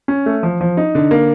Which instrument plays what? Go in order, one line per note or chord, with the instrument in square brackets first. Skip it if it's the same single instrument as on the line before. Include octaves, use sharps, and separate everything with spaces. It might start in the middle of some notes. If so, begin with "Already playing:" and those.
[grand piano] C#4
A3
F3
F3
D#4
D3
A#3